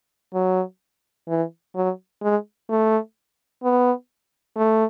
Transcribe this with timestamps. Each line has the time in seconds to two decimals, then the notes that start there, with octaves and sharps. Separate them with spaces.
0.34 F#3
1.28 E3
1.75 F#3
2.22 G#3
2.69 A3
3.63 B3
4.56 A3